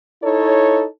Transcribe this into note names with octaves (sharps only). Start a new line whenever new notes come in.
D#4 E4 A4 C#5